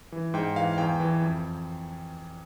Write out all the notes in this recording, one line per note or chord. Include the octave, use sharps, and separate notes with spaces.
E3
G#2 G5
E3 F5
F5
E2 G5
E3
F2